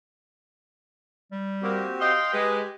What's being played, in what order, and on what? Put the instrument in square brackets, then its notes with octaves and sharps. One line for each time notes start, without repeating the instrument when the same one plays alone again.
[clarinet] G3
[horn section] A#3 [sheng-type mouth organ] C4 F#4 G4
[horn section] D#5 F5 G5 [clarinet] C6
[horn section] G#3 [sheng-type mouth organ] G4 [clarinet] B4